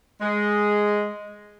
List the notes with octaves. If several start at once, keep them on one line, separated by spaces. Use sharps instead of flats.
G#3